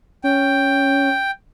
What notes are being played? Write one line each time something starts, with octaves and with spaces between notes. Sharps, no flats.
C#4 G5